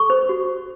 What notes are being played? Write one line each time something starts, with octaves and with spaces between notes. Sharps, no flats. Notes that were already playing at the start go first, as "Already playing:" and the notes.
Already playing: A4 C#6
C5
F#4